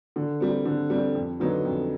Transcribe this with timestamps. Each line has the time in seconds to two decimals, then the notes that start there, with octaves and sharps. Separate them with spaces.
0.16 D3
0.40 G3 C4
0.65 D3
0.90 G3 C4
1.15 F2
1.40 D3 F#3 B3 D#4
1.65 F2